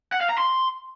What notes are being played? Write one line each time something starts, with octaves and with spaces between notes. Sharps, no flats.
F#5
F5
A#5
C6